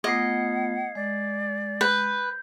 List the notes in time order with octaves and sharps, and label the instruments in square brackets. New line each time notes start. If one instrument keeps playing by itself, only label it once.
[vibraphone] A3 B3 F4 [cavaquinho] D#5 [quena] F#5 [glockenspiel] G#6 C7
[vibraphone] G#3 [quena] D5
[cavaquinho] B4 [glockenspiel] G6